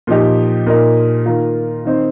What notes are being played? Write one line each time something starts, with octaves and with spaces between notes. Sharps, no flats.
A#2 F3 D#4 G4
A#2 A#3 D#4 A#4
D#3 A#3 F4 A#4
D#3 C4 D#4 C5